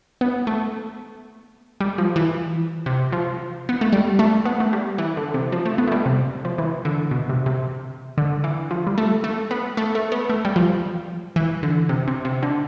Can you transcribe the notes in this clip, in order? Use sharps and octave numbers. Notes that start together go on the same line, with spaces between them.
B3
A3
G3
F3
E3
C3
F3
B3
A3
G3
A3
B3
A3
G3
E3
D3
C3
F3
A3
B3
A3
G3
C3
F3
E3
D3
B2
C3
C3
D3
E3
F3
G3
A3
A3
B3
A3
A3
B3
A3
G3
F3
E3
D3
C3
C3
C3
D3